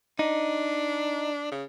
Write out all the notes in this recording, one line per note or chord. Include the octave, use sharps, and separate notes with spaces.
D4 D#4
C#3